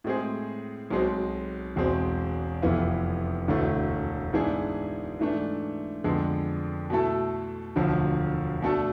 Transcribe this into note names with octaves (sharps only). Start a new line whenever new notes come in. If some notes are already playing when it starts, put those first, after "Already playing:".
A2 G#3 C4 G#4
B1 B2 G#3 C4
E1 E2 B2 G#3 C4
F1 F2 E3 B3 F4
E1 D2 D3 A3 E4
G#2 E3 B3 D4 G#4
G#2 E3 A3 D4
F2 D3 G#3 B3 D4
B2 A3 E4 A4
E1 D2 D3 F3
B2 A3 D4 A4